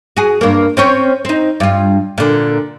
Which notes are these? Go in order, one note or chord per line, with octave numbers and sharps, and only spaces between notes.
F#4 G#4
G2 A#3
C4 C#4 C#5
C4 D#4
G2 F4
A#2 D3